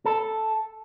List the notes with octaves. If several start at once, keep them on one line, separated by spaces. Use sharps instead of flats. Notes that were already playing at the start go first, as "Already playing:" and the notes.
A4